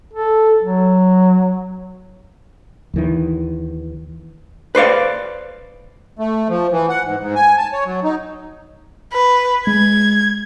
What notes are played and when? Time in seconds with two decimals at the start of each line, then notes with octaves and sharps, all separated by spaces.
0.14 A4
0.62 F#3
2.94 D#2 D#3 E3
4.75 B4 C5 D5 F5
6.19 A3
6.49 F3
6.72 E3
6.89 F#5
7.05 G#2
7.20 G#2
7.35 G#5
7.58 A5
7.73 C#5
7.85 F#3
8.04 D#4
9.13 B4
9.67 G#3 G#6